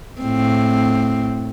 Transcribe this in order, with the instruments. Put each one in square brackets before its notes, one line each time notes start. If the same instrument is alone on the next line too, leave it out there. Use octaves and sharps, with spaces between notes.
[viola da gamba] A2 C4